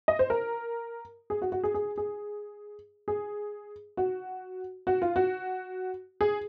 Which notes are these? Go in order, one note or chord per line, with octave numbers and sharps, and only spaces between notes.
D#5
C5
A#4
G#4
F#4
F#4
G#4
G#4
G#4
G#4
F#4
F#4
F4
F#4
G#4